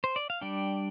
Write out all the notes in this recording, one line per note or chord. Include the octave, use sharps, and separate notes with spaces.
C5
D5
F5
G3 D4 D5 G5